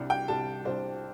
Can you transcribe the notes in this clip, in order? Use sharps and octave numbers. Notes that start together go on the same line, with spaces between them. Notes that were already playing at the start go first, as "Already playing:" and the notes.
Already playing: C2 C3 G3 D4
G5
C2 C3 G3 D4 A5
C2 C3 G3 D4 C5